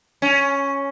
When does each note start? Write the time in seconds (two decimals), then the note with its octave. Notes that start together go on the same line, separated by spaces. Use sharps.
0.22 C#4